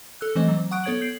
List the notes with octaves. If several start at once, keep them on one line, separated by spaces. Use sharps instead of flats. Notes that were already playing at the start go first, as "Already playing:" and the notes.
A4 E6 F#6
E3 A3 C4 C5 D#5
F#3
F#5 C#6 D#6 F#6 D7
B3 A4 C#5 G#6 D7 F#7
G6 C7 F#7